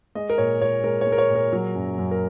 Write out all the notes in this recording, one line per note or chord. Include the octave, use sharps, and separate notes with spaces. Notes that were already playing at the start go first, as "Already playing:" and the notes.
G#3 D#5
A#4
A#2 C#5
A#2 C#5
G#3 A#4
C#5
G#3
A#4
C#5
A#2
A#4
F#3
F#2
F#2
A#4